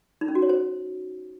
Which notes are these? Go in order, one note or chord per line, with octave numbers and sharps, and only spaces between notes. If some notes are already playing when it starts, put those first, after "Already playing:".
D#4
C#4
F#4
C#5
C5